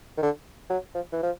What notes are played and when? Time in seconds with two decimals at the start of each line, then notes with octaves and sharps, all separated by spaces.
0.17 D#3
0.22 D3
0.70 F#3
0.95 F3
1.12 E3
1.23 F3